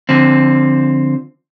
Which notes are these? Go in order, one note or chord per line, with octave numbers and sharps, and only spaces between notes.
D3 F3 C4